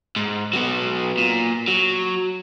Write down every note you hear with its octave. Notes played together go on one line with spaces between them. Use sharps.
G#2
F#3 B3
A#2
F#3